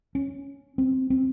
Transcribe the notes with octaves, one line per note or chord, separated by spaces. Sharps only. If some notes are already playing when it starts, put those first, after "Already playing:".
C#4
C4
C4